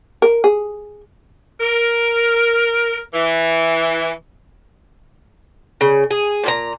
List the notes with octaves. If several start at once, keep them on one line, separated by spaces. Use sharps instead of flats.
A#4
G#4
A#4
E3
C#3
G#4
A#2 F#4 A#5